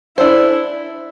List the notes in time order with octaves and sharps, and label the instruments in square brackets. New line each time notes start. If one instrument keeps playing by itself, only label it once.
[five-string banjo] D4 A4 C5 [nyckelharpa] E4